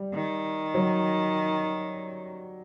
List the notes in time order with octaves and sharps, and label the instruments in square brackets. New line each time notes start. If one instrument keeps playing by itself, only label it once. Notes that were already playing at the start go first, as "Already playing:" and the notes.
Already playing: [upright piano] G3
[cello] D#3
[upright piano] F#3